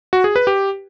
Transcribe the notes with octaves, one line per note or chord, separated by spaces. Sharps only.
F#4
G#4
B4
G4